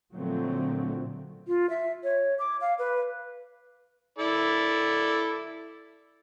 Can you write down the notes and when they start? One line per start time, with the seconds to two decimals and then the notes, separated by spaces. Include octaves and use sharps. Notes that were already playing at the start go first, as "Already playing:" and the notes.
0.13 A#2 D3 F3 F#3 A3 C4
1.47 F4
1.70 E5
2.04 C#5
2.39 D6
2.61 F5
2.79 B4
4.18 E4 A4 D5